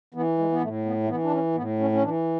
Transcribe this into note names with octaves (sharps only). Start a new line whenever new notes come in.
E3 B3
G#3
B3
A2 A3
B3
A3
E3 B3
D4
C#4
A2 B3
C#4
C#4
E3 D4